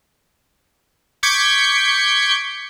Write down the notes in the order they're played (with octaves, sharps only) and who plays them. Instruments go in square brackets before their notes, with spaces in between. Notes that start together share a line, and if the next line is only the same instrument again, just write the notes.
[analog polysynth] C#6 D6 G6 G#6 B6 C#7